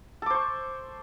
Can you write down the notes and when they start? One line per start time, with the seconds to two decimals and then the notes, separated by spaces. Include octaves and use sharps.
0.22 A4
0.26 D6
0.30 C5
0.34 C#6